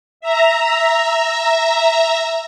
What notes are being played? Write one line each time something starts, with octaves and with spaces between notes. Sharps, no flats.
E5 A#5